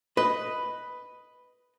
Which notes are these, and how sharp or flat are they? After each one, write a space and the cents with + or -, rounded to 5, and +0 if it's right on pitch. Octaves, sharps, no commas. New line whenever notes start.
B4 +0 D#5 +0